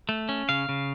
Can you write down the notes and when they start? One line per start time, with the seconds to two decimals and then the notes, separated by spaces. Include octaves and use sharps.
0.09 A3
0.29 C#4
0.49 C#3 F5
0.69 C#3